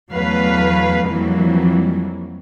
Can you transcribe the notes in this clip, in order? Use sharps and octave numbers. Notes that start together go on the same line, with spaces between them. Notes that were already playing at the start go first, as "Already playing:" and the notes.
E2 F#3 A3 B4 F5
F2 E3 F#3 G3 A#3